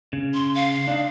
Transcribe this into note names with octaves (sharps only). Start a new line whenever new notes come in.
C#3
C6
F5
D4 D#4